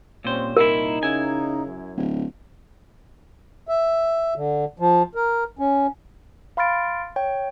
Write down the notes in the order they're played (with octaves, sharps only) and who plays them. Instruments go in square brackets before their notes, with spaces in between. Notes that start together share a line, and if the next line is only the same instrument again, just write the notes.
[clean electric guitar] A#2 C5 [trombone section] G3 C4 C#4
[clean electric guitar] C2 A#2 E4 [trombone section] D#4 [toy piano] A#4
[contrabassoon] C#3 [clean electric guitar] E4 G#5
[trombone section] F#2
[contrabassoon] D1
[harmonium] E5
D3
F3
A#4
C#4
[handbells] F5 B5 C6 F6 A6 D7
C#5 G5